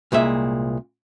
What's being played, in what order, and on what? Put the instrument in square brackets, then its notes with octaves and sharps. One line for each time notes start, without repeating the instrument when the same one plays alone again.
[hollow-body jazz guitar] C2 A#2 G#3 E5